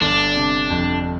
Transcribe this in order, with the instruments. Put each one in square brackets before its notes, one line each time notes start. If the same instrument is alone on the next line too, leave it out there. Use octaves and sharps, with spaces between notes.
[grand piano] G1 [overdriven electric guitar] D4
[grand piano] C3
F2